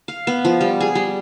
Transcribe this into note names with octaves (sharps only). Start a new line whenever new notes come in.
F5
B3
F3
G3
G#4
G3